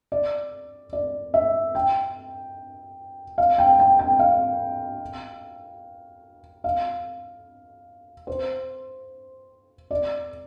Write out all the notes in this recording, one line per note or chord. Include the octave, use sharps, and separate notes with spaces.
D5
D5
E5
G5
F5
G5
G5
G5
F5
F5
C5
D5